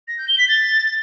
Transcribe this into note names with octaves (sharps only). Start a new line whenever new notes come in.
A#6
G6
G7
B6
A6